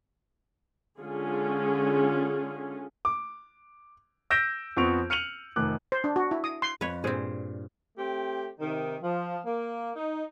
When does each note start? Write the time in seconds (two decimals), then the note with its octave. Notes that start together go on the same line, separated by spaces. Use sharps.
1.00 D3 G#3 C#4 F4 G#4
3.05 D6
4.30 E6 G6 A#6 B6 D7 E7
4.77 F2 B3 C4 C#6 D7 F7
5.10 F6 C#7 D#7 F7 F#7
5.56 F1 D#3 D6 F#6
5.92 C5
6.04 D4
6.16 F#4
6.31 E4
6.44 D#6
6.62 C6
6.81 F2 B4 C#5
7.04 G2 A#2 C4 G#4 C5
7.97 A3 C4 G4
8.59 C3 D#3
9.02 F3
9.44 A#3
9.95 D#4